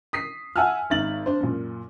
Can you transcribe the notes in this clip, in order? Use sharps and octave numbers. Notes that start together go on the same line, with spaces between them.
D#6 B6 C7
E5 F#5 G#5 A5 E6 F6
G#1 D#4 E5 A6 F#7
D4 C5
F#2 A#2